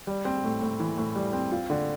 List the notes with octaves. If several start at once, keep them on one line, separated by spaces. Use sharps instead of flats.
G3
C4
A2
A2
E3
A2
G3
C4
F4
D3